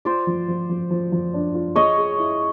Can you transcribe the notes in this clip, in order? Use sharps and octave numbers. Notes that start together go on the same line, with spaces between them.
F4 C5 D5
F3
F3
F3
F3
F3
D4
F4
G#4 C#5 D#5
G#4
E4